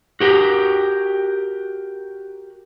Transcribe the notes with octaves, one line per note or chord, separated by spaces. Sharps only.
F#4 G4 A#4